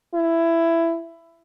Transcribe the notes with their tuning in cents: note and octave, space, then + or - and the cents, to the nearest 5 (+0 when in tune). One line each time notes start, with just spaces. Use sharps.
E4 +15